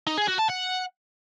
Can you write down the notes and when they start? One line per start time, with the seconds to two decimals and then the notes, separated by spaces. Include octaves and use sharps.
0.07 D#4
0.18 G#4
0.28 F#4
0.39 A5
0.50 F#5